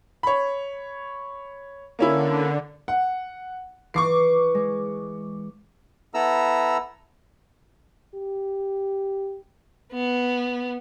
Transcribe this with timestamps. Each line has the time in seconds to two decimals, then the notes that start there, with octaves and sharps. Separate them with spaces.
0.23 C#5 B5
1.99 D3 A#3 C#4 E4
2.88 F#5
3.94 E3 C#6 D6 C7
4.55 G#3
6.14 B3 E4 A4 A#5 E6
8.15 G4
9.93 B3